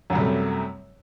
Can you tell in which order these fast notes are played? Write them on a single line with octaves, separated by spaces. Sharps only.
F#2 F#3 G3 C3 A3